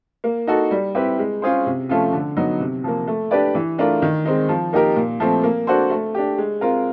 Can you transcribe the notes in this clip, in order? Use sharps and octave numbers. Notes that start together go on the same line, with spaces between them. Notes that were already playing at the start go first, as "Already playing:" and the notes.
A#3
D#4 F#4 A4
G3
C4 E4 G4 B4
G#3
C#4 F4 G#4 C5
C3
F3 A3 C#4 F4
D3
F#3 B3 D#4
C3
F3 A#3
A3
D4 G4 B4 D5
E3
A3 D4 F4 A#4
D#3
G#3 C4 D#4
F3
A#3 D#4 G4 A#4
A#2
F3 A3 C4
A#3
D4 F#4 A4 C5
A3
D4 G4
G#3
C4 F4 A#4